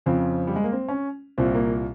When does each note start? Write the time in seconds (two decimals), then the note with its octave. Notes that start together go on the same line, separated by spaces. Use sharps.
0.06 F2 C#3 C4
0.47 G3
0.56 G#3
0.64 A#3
0.72 C4
0.88 C#4
1.38 C2 A#2 C4
1.54 A#3